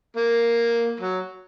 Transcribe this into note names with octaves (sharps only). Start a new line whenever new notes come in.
A#3
F#3